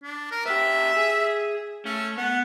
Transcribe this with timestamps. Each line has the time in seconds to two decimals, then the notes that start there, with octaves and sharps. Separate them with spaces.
0.03 D4
0.31 A#4
0.46 B3 G4 E5
0.97 G#4
1.85 A3 C#4
2.17 B3 F#5